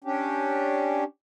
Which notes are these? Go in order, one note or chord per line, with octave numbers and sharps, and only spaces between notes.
C#4 D4 G4